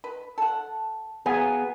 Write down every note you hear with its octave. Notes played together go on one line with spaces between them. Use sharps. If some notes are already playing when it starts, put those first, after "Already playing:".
B4
A4 F#5
F#3 B3 G#4 F5 G#5